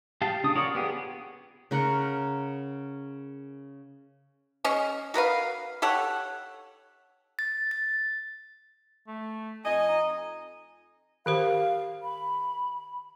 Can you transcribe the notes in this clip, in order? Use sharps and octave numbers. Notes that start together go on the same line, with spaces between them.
G4 F5 A5
C#3 D4 D#6
F4 F#4 A#4 C#5 D5
B3 G4 G#4
C#3 A#4 F#5 C#6
G#3 C#4
F#4 A#4 B4 F5
G4 A4 C#5 F#5
A6
A6
A3
F2 D#5 G#5
D#4
D#3 G4 C5 F5
B5